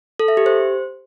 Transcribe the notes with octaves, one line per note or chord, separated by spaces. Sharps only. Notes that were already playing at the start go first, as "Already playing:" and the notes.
A4
E5
G4
C5